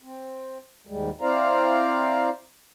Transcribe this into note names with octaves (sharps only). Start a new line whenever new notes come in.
C4
D#2 G#2 G3 G#3
C4 E4 C5 D5 F5 A#5